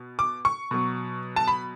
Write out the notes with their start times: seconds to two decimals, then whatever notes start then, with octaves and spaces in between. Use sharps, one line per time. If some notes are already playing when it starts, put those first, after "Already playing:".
Already playing: B2
0.19 D6
0.45 C#6
0.71 B2 F#3
1.36 A5
1.48 B5